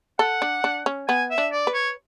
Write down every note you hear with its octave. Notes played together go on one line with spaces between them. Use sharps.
A4 F#5
D4
D4
C#4
B3 G#5
E5
D4
D5
B4
C#5